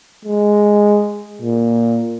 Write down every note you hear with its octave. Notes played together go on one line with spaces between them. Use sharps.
G#3
A#2